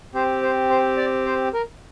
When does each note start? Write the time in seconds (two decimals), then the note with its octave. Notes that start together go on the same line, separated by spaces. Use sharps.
0.14 C4 G4 C5
0.42 C5
0.70 C5
0.97 D5
1.26 C5
1.53 A#4